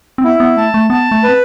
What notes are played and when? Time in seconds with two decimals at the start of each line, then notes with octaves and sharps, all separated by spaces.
0.18 C4
0.24 B3 E4
0.40 B3
0.57 A3 A5
0.74 A3
0.90 B3 A5
1.11 A3
1.23 C4 B4